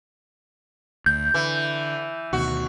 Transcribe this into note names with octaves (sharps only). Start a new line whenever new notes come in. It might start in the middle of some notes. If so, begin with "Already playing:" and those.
D2 G6
D3 E3
D2 B2 D#3 F#4